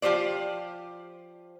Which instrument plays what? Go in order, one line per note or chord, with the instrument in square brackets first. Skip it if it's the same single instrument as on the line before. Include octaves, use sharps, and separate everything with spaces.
[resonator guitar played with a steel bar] F3 F4 G4 C5 D5